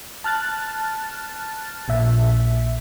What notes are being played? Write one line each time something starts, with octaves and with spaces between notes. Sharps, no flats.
A5 F6 F#6 A6
A#1 A#2 E5